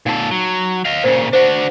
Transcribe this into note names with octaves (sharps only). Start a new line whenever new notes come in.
A#2 D#4 A4 A5
F#3
D#5 F5
A#2 C#3 C5
D4 F#4 C5